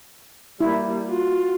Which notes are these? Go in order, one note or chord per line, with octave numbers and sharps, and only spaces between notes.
G3 A#3 E4
F4 F#4